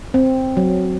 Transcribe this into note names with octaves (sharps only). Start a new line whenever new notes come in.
C4
F#3